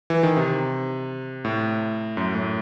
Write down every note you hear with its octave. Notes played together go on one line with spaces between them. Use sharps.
E3
D#3
C3
A2
F#2
A2